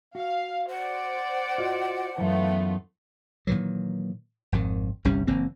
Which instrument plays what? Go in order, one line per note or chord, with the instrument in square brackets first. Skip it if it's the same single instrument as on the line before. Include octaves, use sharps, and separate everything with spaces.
[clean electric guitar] F#4 [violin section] F5
[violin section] C5 D5 [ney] F#5
[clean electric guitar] F4 F#4 D#5
[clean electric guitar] F#2 E3 [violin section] A3 B3 F4
[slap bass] A#2 D#3 E3 F#3
G#1 F2 D#3
G1 C2 G3 C#4
F#1 E3 A#3 C4